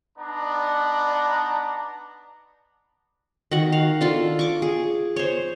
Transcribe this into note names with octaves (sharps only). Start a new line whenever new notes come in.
B3 D4 D#4 D5 A5 A#5
D#3 F#4 F#5
F5
D4 F4 A4
C#6 D6
G#4
C5 C#5